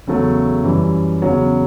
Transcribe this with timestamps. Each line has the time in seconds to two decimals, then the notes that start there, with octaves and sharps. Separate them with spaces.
0.07 E2 C#3 F#3 A3
0.64 F#2 E3 G3
1.22 E2 C#3 F#3 C#4